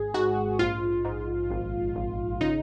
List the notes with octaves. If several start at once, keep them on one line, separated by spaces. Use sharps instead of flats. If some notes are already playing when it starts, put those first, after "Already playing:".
Already playing: G#1 G#4
G#2 F#4
A#1 F4
G#2
G#1
G#1
C#3 D#4